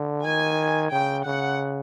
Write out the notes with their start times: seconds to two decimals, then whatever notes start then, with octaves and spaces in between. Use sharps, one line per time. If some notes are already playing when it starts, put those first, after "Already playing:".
Already playing: D3
0.25 D#3 G#5
0.91 C#3 G5
1.25 C#3 F#5